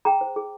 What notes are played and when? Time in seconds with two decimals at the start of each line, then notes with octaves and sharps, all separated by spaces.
0.05 G#4 G5 A#5
0.21 C5
0.36 G#4